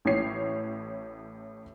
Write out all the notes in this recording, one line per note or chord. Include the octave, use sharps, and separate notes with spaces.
A1 A2 C#5 C7